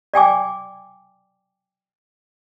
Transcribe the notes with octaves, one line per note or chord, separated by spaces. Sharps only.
D5 G5 G#5 D6